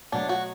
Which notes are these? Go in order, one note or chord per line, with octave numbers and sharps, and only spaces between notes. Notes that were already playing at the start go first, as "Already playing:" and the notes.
B2 F#3 A3 D4
F#4